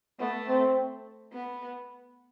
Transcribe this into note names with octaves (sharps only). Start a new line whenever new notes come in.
A3 B3
C4
B3